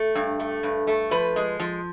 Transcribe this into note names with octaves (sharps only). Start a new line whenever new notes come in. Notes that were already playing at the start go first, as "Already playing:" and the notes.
Already playing: A3
G2
A3
G2
A3
F3 B4
G#3
F3